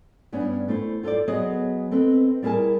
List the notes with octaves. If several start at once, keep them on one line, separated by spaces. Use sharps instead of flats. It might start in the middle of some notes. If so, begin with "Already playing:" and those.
G2 B3 C#4 D4
A3 E4 C5
F4 A4 A#4 C5 D5
F#3 B3 G#4 C#5 D#5
C4 A4 B4 D#5
G3 E4 G#4 A#4 G#5 A5